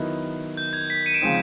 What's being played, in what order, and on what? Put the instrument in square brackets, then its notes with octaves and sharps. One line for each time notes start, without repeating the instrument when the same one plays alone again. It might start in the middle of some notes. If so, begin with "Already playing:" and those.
Already playing: [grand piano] D#3 F#3 B3 E4
[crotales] G6
G#6
B6
C#7 D#7
D7 E7
[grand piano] C#3 F3 G#3 C4 D#4